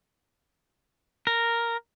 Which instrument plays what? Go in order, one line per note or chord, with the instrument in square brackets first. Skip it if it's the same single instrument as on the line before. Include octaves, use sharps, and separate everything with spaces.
[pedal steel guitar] A#4